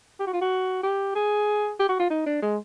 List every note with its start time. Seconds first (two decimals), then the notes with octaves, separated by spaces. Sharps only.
0.20 G4
0.27 F#4
0.33 F4
0.41 F#4
0.83 G4
1.15 G#4
1.80 G4
1.89 F#4
2.00 F4
2.10 D#4
2.26 D4
2.42 G#3